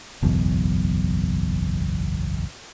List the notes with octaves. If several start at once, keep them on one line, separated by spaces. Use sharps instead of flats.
F#1 B1 E2